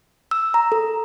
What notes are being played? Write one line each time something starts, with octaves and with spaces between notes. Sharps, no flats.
E6
A#5
A4